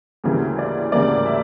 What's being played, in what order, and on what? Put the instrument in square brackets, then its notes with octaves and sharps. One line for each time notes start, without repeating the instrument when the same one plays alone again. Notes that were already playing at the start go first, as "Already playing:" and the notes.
[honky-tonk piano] D2 C#3 E3 G3 A#3
D5
D2 C#3 E3 G3 A#3 D5
E5